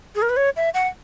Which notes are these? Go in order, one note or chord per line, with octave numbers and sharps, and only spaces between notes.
G#4
A#4
B4
C#5
E5
F#5